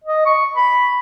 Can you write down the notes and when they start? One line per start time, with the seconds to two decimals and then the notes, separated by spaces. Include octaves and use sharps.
0.04 D#5
0.26 C#6
0.56 B5